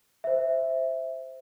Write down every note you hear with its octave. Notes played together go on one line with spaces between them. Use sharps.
C5 E5